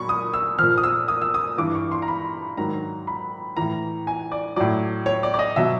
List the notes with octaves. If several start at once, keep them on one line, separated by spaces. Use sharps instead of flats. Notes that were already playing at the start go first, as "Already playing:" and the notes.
Already playing: A#2 F#3 B5 C#6
D#6
E6
A#2 F3 F6
D#6
E6
D#6
E6
D#6
G2 E3 D6
C#6
C6
A#5
B5
G#2 D#3 F#3 A#5
B5
A2 E3 A#5
G#5
D5
A2 F#3 D5
C#5
D5
D5
D#5
B2 F#3 E5